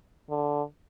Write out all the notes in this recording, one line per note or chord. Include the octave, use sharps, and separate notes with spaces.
D3